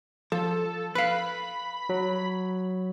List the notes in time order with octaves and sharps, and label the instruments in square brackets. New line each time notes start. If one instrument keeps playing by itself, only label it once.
[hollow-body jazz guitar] F3 [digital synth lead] A4
[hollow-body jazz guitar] B4 F5 [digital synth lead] B5
[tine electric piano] F#3